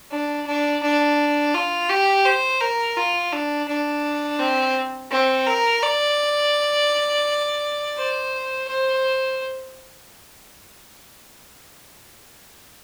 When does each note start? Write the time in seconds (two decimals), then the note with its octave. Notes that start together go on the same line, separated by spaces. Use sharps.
0.11 D4
0.46 D4
0.82 D4
1.54 F4
1.89 G4
2.25 C5
2.61 A#4
2.97 F4
3.32 D4
3.68 D4
4.39 C4
5.11 C4
5.46 A#4
5.82 D5
7.97 C5
8.68 C5